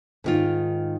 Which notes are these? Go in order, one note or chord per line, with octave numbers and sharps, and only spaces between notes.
G#2 D#3 F4